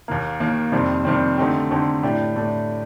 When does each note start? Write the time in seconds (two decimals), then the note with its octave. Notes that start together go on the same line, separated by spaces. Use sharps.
0.08 D#2 D#3 A#3
0.40 D#2 D#3 A#3
0.72 F2 C3 D#3 G3 C4
1.05 F2 C3 D#3 G3 C4
1.38 D3 A3 C4 D#4 G4
1.71 D3 A3 C4 D#4 G4
2.03 A2 A3 D4 G4
2.36 A2 A3 D4 G4